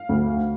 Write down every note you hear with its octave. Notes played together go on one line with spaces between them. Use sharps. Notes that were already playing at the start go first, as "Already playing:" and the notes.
Already playing: F5
D2